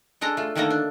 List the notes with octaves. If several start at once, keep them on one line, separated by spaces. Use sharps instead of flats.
G#3 D4 A4 A#5
A3 F4
D3 D#3 A3 A#3 A4 A#5
D4